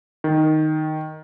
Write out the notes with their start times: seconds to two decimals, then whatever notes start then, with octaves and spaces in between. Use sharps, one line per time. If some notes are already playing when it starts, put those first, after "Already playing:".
0.24 D#3